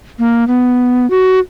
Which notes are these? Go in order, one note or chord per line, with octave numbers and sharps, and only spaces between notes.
A#3
B3
F#4